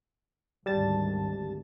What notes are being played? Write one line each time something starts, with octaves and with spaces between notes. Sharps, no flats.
G#1 D2 G3 A5 A6